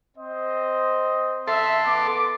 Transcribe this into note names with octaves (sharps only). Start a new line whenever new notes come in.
C4 C5 D#5
A4 E5 C6
B3 D6